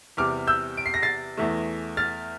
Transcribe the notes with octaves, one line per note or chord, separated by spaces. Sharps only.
E2 C3 G3 D6 F6
E6 G6
D7
C7
A#6
A6 C7
E2 E3 A3
F6 A6